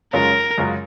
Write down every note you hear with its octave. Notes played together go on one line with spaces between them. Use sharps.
F#2 C#3 G#3 C#4 F4 A#4
F#2 C#3 G#3 C#4 F4